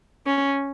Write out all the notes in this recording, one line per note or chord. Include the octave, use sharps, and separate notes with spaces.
C#4